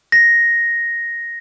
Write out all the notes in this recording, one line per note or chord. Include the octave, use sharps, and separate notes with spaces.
A#6